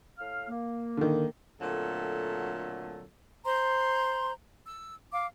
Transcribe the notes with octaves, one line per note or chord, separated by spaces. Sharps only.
A2 F5 F6
A#3
D3 D#3
A#2 D3 F#3 A3 C4 A4
C5 A#5 C6
E6
F5 D6